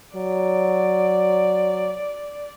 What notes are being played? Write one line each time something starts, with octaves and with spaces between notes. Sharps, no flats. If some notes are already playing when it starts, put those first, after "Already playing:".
F#3 D5